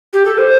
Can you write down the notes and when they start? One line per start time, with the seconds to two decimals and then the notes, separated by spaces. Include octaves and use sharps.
0.13 G4
0.25 A4
0.38 C5